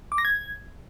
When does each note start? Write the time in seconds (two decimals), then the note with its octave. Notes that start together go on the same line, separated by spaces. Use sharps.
0.12 D6
0.18 A#6
0.25 G#6